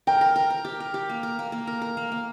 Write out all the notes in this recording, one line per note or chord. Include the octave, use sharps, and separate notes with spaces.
A#4 G5
A#4
A#4
A#4
G4
A#4
G4
A#3
A#4
A#3
A#3
A#4
A#4
A#3
A#3